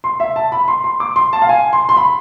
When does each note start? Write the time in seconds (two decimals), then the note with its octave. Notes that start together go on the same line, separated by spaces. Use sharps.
0.04 C6
0.20 E5
0.36 A5
0.52 B5
0.68 C6
0.84 C6
1.00 D6
1.16 C6
1.33 A5
1.42 F5
1.49 G#5
1.73 C6
1.89 C6
1.97 B5